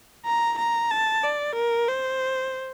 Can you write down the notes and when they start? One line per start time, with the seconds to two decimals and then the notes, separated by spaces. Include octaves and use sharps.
0.26 A#5
0.59 A#5
0.91 A5
1.23 D5
1.55 A#4
1.89 C5